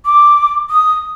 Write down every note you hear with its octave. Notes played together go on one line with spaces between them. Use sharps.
D6
D#6